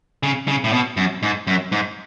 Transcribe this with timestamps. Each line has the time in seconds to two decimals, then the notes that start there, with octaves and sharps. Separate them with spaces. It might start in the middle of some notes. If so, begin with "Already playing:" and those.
0.23 C#3
0.48 C#3
0.64 A2
0.73 B2
0.97 F#2
1.23 G#2
1.47 F#2
1.72 G#2